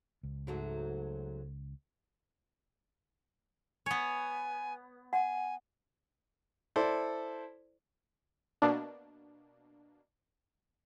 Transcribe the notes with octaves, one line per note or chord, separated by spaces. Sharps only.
C#2
G#2 F#3 A3
B3 C#5 G#5
F#5 G#5
E4 A4 C5 D5
B2 A#3 D4